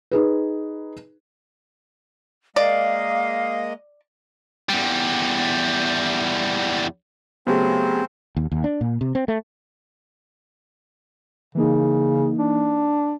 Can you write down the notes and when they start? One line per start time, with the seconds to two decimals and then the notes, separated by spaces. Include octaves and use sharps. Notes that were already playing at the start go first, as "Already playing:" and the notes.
0.11 D#4 G#4 B4
2.56 G#3 A#3 D5 D#5 F5
4.69 E2 G3
7.47 C#3 F#3 A3 B3 C4 G4 G#4 C5
8.37 D#2
8.52 D#2
8.64 D4
8.81 A#2
9.01 C3
9.15 C4
9.28 A3
11.55 C#3 E3 A#3 D#4
12.38 D4